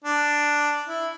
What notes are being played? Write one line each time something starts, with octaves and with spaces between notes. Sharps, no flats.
D4
E4